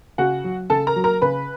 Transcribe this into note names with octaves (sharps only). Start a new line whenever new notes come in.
C#3 F#4 F#5
F#3
C#3 A4 A5
A#4 A#5
F#3
A#4 A#5
C#3 B4 B5